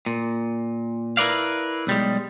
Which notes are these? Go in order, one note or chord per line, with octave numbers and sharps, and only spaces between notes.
A#2
E4 A#4 B4 D5 F5
B1 G3 G#3